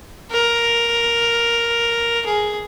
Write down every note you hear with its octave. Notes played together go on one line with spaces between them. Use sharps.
A#4
G#4